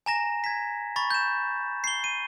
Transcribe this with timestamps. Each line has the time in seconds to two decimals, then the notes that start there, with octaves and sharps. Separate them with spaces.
0.06 G#5 A#5 A#6 E7
0.44 G#6 B6
0.96 B5 C#6 A6
1.10 G6 E7
1.84 C7 G7
2.04 D#7